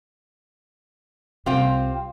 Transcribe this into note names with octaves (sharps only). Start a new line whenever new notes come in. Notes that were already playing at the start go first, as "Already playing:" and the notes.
C2 C3 C4 F4 G4